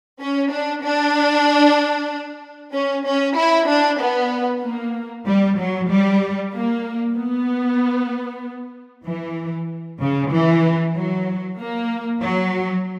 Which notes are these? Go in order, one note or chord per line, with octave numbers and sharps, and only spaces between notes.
C#4
D4
D4
C#4
C#4
E4
D4
B3
A#3
G3
F#3
G3
A#3
B3
E3
C#3
E3
F#3
A#3
F#3